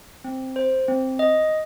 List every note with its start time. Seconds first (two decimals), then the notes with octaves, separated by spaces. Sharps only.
0.24 C4
0.56 C5
0.88 C4
1.19 D#5